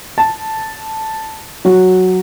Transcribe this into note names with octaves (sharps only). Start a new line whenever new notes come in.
A5
F#3 F#4